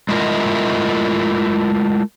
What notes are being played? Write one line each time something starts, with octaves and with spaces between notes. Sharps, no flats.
G#3 A3 E4 F4 A#4 D#5